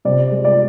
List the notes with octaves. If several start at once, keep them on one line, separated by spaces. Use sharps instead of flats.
C3 D5
G#3
D5